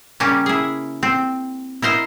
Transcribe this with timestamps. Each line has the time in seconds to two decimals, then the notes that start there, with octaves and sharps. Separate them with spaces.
0.20 C#3 G3 A#3 C#4
0.46 E4 G#4
1.03 C4
1.82 E4 A#4 C5 D#5